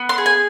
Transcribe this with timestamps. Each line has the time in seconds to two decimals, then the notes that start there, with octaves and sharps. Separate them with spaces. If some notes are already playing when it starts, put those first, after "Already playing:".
Already playing: B3
0.09 C6
0.18 G#4
0.26 G#5